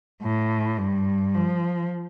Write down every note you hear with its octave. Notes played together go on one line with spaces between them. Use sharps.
A2
G2
F3